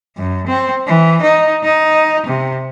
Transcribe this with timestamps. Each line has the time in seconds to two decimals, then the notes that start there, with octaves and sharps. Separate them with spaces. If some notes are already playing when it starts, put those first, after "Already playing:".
0.17 F#2
0.47 C4
0.86 E3
1.22 D#4
1.64 D#4
2.27 C3